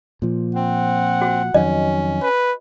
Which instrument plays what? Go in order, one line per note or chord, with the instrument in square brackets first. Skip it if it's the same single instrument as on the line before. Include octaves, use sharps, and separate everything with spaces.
[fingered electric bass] A#2 F3
[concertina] C4 [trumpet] F#5
[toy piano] F#4
[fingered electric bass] F2 D#3 F#3 [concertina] C#4 [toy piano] D#5
[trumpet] B4